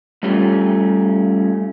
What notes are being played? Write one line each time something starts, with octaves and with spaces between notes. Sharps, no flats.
G3 A3 C#4 F4 G4